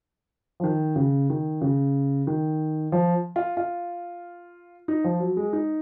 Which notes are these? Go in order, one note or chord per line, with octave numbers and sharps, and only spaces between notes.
F3
D#3
C#3
D#3
C#3
D#3
F3
F4
F4
D#4
F3
F#3
G#3
D#4